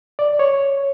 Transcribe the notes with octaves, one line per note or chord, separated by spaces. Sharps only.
D5
C#5